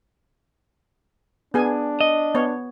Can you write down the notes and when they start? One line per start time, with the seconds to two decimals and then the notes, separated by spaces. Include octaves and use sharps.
1.54 B3 D4 G#4 G#5
2.01 D#5
2.35 B3 C#5